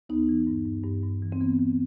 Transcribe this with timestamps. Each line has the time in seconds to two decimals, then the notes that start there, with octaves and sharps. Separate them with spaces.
0.09 D#2 B3 D#4
0.29 E3
0.47 G2
0.65 G2
0.84 G2
1.03 G2
1.22 E3
1.32 C4
1.40 E3 B3
1.60 E3